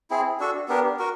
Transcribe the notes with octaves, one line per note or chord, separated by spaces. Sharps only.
C4 E4 G#4
D4 F#4 A4
B3 D4 G4 A#4
F#4 A#4